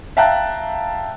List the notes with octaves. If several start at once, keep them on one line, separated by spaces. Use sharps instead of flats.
E5 F5 G5 A5 A#5 F#6